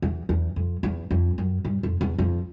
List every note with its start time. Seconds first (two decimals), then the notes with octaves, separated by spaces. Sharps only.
0.02 E2
0.29 E2
0.56 F2
0.83 E2
1.11 F2
1.38 F#2
1.65 G2
1.83 F2
2.01 E2
2.18 F2